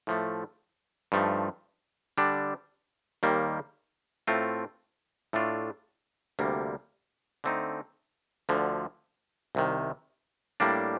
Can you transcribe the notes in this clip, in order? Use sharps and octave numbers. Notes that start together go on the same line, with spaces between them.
A2 F3 A3
G2 F3 A3 D#4
D3 G3 D4
D#2 D#3 G3 A#3
A2 A3 C4 F4
A2 A3 D4 F4
D2 C3 G3 A#3
D3 A3 C4 D#4
D2 D3 F3
C2 C3 D#3
A2 G3 A#3 D4